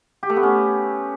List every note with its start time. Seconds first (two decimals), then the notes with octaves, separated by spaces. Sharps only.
0.23 G4
0.30 A3
0.36 B3
0.43 C#4